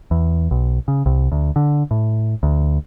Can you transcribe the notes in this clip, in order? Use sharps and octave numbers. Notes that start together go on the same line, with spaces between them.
E2
B1
C#3
C2
D2
D3
A2
D2